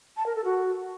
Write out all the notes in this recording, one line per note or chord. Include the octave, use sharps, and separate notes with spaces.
A5
A#4
A4
F#4